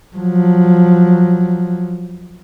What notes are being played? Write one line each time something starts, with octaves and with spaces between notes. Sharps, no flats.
F3 F#3